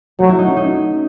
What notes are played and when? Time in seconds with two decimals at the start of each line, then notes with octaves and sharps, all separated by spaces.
0.20 F#3 A3
0.29 E4
0.39 D#4
0.47 C#4
0.56 D#4